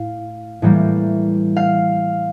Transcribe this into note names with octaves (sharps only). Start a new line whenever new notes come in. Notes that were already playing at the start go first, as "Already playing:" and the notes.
Already playing: A2 F5
A2 E3 G3 A#3
F5